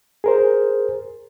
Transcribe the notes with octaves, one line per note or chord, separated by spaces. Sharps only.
G#4 A#4 C5